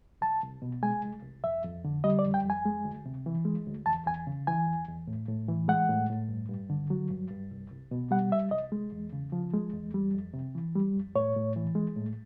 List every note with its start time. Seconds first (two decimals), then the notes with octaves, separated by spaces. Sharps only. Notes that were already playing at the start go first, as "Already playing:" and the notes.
0.21 C2 A5
0.42 C2
0.62 B2
0.83 G#3 G#5
1.03 C2
1.23 C2
1.44 F2 E5
1.64 F2
1.84 D3
2.04 G3 D#5
2.19 D5
2.25 F2
2.34 G5
2.44 F2
2.50 G#5
2.65 G#3
2.85 D2
3.06 C3
3.26 E3
3.45 G#3
3.66 D2
3.86 E2 A5
4.07 E2 G#5
4.27 C#3
4.47 E3 G#5
4.67 E2
4.88 E2
5.07 A2
5.29 A2
5.49 E3
5.68 G#3 F#5
5.89 A2
6.10 A2
6.29 G2
6.49 G2
6.70 D3
6.90 F#3
7.10 G2
7.31 G2
7.51 C2
7.70 C2
7.91 B2
8.11 G3 F#5
8.31 C2 E5
8.51 C2 D#5
8.72 G#3
8.92 E2
9.13 C#3
9.32 F3
9.53 G#3
9.73 E2
9.94 G3
10.14 F2
10.34 C3
10.55 E3
10.75 G3
10.95 F2
11.15 A2 C#5
11.36 A2
11.56 E3
11.75 G#3
11.96 A2